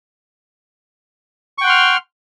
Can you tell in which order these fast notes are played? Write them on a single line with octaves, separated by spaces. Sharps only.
C#6 G5 F#5 C6 F6